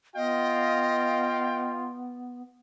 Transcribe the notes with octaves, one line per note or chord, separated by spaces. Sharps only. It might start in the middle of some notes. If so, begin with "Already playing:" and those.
B3 F4 D#5 F5 G5